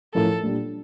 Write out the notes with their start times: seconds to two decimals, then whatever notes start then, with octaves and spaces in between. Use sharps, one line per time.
0.15 A2 F3 C#4 E4 A4 A#4
0.43 A#2 G3 D4